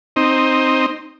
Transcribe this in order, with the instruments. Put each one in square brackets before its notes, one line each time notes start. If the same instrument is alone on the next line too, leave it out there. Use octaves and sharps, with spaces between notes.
[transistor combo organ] C4 D#4